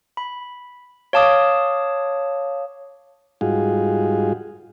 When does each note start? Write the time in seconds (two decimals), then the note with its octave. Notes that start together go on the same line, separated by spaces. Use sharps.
0.17 B5
1.13 C#5 F5 A5 D6 D#6
3.41 G#2 G3 D#4 F4 F#4 G#4